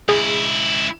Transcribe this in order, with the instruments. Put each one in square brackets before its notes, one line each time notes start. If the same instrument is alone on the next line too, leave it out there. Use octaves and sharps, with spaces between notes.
[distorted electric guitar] C#2 E4 [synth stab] G#4